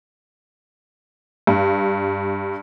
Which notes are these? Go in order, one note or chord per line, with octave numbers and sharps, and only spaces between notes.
G2